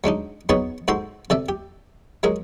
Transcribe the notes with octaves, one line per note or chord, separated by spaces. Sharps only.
F#3 G#3 D4 D#4
F#3 B3 D#4 G#4 C#5 A5
G#2 F#4 A4 C5 A#5 C6
C3 A4 D5 E5
G4
F#3 G#3 G#4 A#4